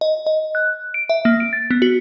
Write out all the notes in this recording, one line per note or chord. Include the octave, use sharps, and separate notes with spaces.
D#5
D#5
F#6
D7
E5
A#3
D7
A6
B3
F#4